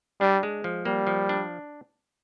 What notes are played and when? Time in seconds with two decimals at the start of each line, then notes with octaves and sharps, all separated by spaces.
0.21 G3 D4
0.43 G#3
0.64 F3
0.85 G3 A#3
1.07 F3
1.29 D4